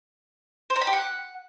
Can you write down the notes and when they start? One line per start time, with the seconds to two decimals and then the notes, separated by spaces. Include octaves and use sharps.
0.70 C5
0.76 A#5
0.81 B5
0.87 G4
0.93 F#5